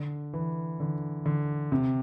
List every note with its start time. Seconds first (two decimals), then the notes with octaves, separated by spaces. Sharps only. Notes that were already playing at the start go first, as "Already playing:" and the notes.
Already playing: D3
0.33 E3
0.80 D3
1.26 D3
1.72 C3